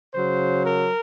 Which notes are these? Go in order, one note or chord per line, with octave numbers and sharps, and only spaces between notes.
C#3 F#3 C5
A#4